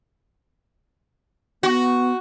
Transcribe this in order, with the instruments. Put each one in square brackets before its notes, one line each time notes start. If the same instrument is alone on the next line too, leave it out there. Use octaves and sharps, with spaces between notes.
[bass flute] B3 [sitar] F#4